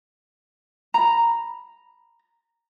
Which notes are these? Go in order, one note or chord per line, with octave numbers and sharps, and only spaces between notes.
A#5 B5